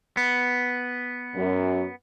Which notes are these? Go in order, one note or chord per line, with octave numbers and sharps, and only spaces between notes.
B3
F#2